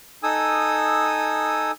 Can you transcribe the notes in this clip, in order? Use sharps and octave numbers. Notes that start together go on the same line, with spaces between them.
D#4 A4 G#5 D#6 E6